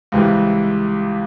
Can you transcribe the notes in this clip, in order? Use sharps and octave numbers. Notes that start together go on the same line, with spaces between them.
C#2 C3 E3 G3